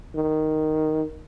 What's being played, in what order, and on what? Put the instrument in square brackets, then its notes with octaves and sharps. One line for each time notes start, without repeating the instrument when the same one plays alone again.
[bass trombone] D#3